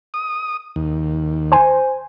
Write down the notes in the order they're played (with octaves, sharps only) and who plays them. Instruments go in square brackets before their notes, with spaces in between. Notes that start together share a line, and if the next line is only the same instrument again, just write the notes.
[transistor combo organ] D#6
D#2
[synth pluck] C5 G#5